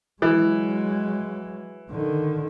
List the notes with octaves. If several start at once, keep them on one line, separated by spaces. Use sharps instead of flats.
E3 F#3 G#3
D3 D#3